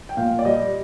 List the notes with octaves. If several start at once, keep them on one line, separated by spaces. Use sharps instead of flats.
G5
A#2 F5
D5
G3 D#5